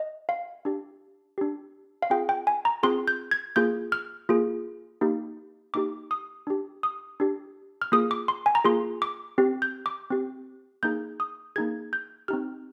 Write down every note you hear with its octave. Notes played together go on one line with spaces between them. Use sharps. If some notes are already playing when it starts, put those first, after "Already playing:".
Already playing: D#5
F5
D4 G4
D4 G4
F5
C4 F4 G#4 G5
G5
G#5
A#5
C4 F4 G#4 C6
G6
G#6
A#3 F4 G#4 G6
F6
A#3 F4 G#4
A#3 D#4 G4
A#3 D#4 G4 D6
D#6
D4 G4
D#6
D4 G4
F6
A#3 F4 G#4 D#6
D6
C6
G#5
A#5
A#3 F4 G#4 C6
D6
C4 G4
G6
D6
C4 G4
A#3 D#4 G#4 G6
D#6
A#3 D#4 G#4 G#6
G6
C4 D#4 G4 F6